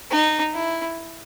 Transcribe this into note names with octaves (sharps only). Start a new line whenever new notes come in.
D#4
E4